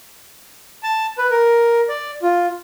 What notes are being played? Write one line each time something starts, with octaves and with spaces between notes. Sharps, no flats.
A5
B4
A#4
D5
F4